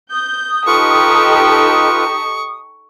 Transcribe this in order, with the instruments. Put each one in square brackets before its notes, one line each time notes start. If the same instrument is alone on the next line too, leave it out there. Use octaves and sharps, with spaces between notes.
[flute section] D#6 [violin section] G6
[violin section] D#4 G4 A4 [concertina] F4 B4 [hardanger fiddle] C#6